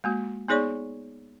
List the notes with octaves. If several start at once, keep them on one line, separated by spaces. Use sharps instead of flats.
G#3 A#3 F#4
B3 D#4 G#4 C#5 D5 C#6